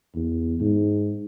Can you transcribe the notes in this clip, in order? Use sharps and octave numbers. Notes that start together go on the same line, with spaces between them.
E2
G#2